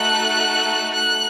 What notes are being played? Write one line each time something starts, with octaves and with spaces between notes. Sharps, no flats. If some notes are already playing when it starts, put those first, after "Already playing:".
Already playing: A3 D#4 F#4 A4 F#6
F#6